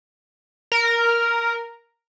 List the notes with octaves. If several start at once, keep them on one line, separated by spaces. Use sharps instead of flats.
A#4